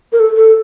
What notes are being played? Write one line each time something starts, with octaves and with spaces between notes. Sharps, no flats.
A#4
A4
A4